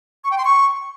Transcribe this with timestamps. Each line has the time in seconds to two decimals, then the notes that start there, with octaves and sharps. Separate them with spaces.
0.24 C#6
0.31 G5
0.38 C6
0.45 C#6